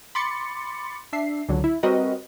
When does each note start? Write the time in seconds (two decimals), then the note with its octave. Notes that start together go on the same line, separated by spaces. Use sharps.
0.15 B5 C6 D6 A6 C#7
1.13 D4 E5 C7
1.49 C#2 D3 F#3
1.64 E4
1.83 G3 C4 F#4 A#4 B4 D#5